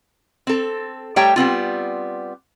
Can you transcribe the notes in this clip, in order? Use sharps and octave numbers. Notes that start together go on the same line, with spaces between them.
C4 A4
G3 A3 G4 C#5 G5 A#5
G3 B3 C4 F4